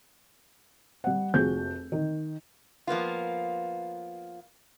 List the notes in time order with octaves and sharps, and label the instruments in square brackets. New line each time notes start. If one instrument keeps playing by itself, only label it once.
[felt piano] G3 F#5
F1 F2 C4 F#4 G#4 G6
D#3
[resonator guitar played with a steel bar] F3 A#3 B3 F4